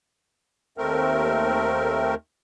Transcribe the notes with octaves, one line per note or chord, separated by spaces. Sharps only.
D#2 A3 C4 A#4